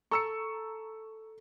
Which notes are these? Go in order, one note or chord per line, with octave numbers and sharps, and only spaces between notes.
A4 A#5 C#6 E6 C#7